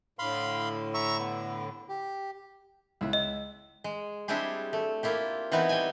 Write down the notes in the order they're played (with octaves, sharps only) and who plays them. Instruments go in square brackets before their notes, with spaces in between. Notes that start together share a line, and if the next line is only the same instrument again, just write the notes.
[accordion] A2 D3 [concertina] F5 B5 C6
[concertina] E5 A#5 C#6
B3
G4
[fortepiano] C#2 E4
[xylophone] D#5
[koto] G#3
G3 C4 D4 E4 G4 G#4
A3
A#3 E4 F4 G4
E3 B3 C4 D#4 E4
G3 G5 G#5